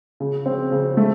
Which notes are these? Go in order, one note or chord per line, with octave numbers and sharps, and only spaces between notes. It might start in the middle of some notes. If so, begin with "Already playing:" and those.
C#3
C4
C#3
A3